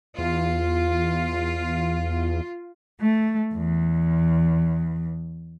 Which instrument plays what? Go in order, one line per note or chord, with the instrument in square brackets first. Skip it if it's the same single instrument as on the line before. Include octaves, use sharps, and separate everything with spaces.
[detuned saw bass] E2 [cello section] F4
[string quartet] A3
E2